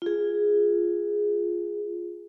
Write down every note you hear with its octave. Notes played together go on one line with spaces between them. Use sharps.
F4 G#4